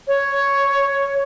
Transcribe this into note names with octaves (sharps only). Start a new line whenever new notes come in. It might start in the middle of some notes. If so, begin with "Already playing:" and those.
C#5